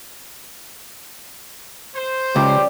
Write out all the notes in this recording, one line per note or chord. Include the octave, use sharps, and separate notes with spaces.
C5
C#2 F3 G3 C#4 G4